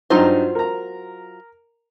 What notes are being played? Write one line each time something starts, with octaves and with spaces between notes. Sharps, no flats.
G2 F#3 D#4 F4 C5 A#5
A#4 A#5